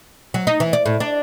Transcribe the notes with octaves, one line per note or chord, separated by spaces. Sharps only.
F#3
D#4
E3
D5
A2
D4